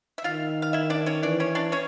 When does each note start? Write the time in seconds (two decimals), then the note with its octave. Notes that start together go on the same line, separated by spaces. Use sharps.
0.18 E5
0.24 D#3 F4 F5
0.62 F5
0.73 E4 E5
0.90 D4 D5
1.06 C#4 C#5
1.23 E3 D4 D5
1.40 C#4 C#5
1.55 D4 D5
1.72 C#4 C#5